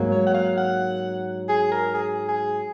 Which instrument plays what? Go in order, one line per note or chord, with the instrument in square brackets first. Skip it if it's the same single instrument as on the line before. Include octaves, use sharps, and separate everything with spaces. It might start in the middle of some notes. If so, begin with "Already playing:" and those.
Already playing: [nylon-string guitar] G#2 F#3 A#3
[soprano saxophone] C#5
F#5
F5
F#5
G#4
A#4
G#4
G#4